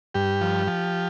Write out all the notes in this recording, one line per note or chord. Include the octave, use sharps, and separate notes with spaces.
G2 G4
F3
F3